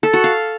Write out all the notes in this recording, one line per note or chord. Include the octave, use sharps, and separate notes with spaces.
A4
F#4
F5